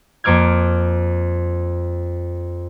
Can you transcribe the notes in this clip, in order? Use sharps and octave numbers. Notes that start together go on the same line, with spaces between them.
F2 A#3 D6 F6 G#6